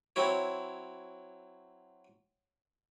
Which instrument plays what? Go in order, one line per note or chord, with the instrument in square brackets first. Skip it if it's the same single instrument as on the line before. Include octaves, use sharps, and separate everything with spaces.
[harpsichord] F#3 C4 E4 C#5